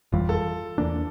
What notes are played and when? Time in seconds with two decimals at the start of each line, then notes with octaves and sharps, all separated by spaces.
0.12 G1 F2 E3 G3 F4
0.29 A4
0.78 E2 E3 A#3 D4